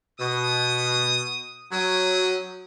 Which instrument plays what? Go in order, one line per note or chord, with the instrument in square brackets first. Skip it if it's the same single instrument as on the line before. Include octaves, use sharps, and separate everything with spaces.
[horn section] B2 [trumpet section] D#6
[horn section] F#3 [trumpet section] C#4 G5 D#6